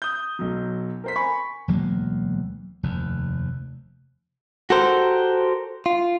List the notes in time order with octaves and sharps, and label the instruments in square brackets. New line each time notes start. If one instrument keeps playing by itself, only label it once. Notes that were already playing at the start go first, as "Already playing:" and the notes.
[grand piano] D#6 G6
B1 F#3
A#4 C5 B6
G#5 B5 C#6
[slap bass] E1 D2 F#3 A#3
F1 D#2
[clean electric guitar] F#4 G4 A4 A#4 C5
F4